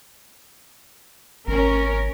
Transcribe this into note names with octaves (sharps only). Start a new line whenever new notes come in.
G#1 C#4 A#4